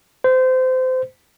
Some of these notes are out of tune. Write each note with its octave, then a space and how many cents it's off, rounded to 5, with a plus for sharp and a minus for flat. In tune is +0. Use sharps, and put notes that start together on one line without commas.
C5 -25